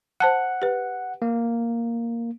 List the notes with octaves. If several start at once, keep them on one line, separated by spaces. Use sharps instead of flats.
C5 F#5 A5 F#6
G4 B4
A#3